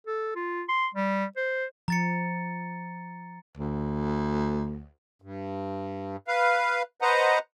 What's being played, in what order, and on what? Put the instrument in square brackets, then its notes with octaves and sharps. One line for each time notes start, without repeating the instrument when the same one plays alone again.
[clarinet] A4
F4
C6
G3
C5
[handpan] F3 [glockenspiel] A#5 A6 C#7
[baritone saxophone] D2
[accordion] G2
B4 F5
B4 C5 D#5 F#5 A#5